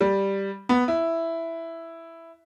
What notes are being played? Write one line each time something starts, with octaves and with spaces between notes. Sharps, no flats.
G3
B3
E4